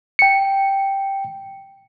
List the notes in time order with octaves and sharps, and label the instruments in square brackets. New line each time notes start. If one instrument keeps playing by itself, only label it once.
[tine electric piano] G5 C#7